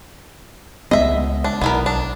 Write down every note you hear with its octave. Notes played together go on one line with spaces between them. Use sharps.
C#2 G#3 B3 D#5 E5
D4
B1 B3 E4 A#4
D4